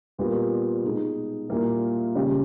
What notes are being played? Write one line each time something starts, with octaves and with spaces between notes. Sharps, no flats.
A#2 G3 B3 G4 A#4
B2 G#3 D#4 G#4
A#2 G3 A#3 E4
C#3 G3 C#4 G4